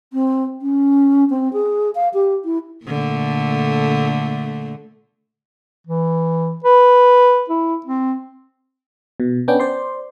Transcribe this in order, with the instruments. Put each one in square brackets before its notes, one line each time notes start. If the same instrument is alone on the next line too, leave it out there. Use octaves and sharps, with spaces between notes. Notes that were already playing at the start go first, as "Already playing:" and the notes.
[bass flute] C4
C#4
C4
G#4
F5
G4
E4
[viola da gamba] A#2 D3 A3
[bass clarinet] E3
B4
E4
C4
[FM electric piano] B2
B3 C#4 D4 G5
C5 D5 C6